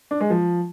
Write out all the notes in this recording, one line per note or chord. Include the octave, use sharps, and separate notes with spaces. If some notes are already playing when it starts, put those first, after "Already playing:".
D4
G#3
F3